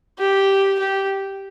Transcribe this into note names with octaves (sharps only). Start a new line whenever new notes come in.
G4
G4